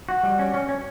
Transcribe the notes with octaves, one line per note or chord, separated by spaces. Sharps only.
F#4
G3
C#4
C#4
C#4